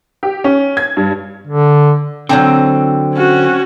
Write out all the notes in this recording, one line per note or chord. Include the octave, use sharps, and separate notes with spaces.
G4
C#4
G#6
G2
D3
D3 F#3 A#3 C4
C#4 F#4